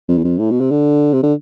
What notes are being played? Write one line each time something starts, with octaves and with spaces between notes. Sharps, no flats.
F2
E2
F2
A2
B2
C3
D3
C3
D3